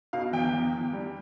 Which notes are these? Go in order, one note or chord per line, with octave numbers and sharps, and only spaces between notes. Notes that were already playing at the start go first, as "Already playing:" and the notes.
B2 F5
E2 G5
E2
E2
G3